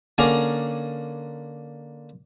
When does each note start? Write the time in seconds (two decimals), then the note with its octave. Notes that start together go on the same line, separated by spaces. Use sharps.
0.18 D3 A#3 C#4 G#4 D5 A#5